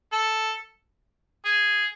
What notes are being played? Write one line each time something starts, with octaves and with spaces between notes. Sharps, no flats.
A4
G#4